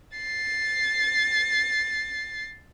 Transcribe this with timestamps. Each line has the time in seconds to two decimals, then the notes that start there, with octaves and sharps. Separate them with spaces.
0.17 A6 C7